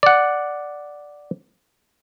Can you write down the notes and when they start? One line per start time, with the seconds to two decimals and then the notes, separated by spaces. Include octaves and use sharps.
0.03 D5 F#5